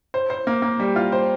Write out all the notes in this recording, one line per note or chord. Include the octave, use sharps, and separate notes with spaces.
C5
C5
A#3
A#3
G3
F4
C5